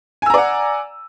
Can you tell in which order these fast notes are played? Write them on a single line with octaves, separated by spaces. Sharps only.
G#5 E6 A#5 D5 F#5